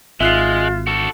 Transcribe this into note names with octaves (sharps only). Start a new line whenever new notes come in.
G#1 G#3 F4 E5 F#6 C7
F#4 A4